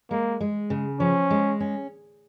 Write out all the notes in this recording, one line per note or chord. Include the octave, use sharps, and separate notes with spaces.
G#3 A#3
G#3
C#3
F3 C#4
G#3
C#4